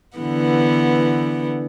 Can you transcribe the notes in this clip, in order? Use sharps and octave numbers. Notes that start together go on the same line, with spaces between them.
D3 E3 B3